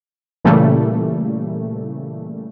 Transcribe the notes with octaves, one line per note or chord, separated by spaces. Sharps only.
A#2 C#3 E3 G3 A3 A#3